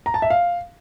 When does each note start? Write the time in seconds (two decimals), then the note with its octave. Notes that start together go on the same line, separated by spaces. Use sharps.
0.06 A#5
0.14 A5
0.22 E5
0.30 F5